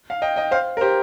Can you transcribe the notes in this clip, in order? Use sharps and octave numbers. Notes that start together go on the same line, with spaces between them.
F5
D#5 G5
D#5 G5
C5 F5
A#4
G4 C5